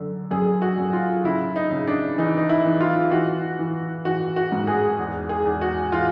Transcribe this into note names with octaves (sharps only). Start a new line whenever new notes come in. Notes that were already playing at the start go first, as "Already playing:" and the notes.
Already playing: F#2 D3
F#2 G#4
F#4
F#2
F4
C#3 E4
D#4
C#3
D4
E3 D#4
D#4
E4
E3
F4
E3 F#4
E3
E3 F#4
F#4
G#2
G#4
E2
G#4
E2
F#4
E3 F4